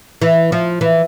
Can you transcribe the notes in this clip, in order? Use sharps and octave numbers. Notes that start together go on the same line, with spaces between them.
E3
F3
E3